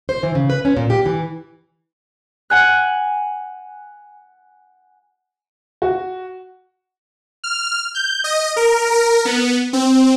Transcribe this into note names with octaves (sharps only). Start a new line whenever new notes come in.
C5
E3
C#3
B4
C#4
A#2
G4
E3
F#5 G#5 F#6
F#4
F6
G6
D#5
A#4
A#4
B3
C4